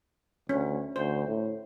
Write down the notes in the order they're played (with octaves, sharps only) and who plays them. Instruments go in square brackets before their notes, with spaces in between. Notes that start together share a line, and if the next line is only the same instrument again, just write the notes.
[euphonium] D2 [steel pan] C#4
[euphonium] D2 [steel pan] C5
[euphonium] A2